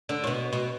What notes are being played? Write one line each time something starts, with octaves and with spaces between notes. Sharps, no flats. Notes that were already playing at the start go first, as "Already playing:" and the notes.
D3
A2
B2
B2